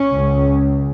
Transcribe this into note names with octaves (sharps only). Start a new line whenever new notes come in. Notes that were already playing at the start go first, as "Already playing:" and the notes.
Already playing: C#4
C#2 C#3